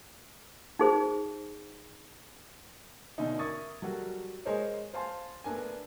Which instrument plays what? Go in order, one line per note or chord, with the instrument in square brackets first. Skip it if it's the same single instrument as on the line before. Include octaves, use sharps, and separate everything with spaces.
[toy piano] D#4 G#4 C5
[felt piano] B2 D3 A3 C#4 D#4
A#4 E5 C#6 D#6 G#6 A6
F#3 G3 F#4 A4 A#4
G#3 G#4 A#4 C5 C#5 D#5
C5 F5 G#5 A5 C6
A3 B3 D4 A#4 G#5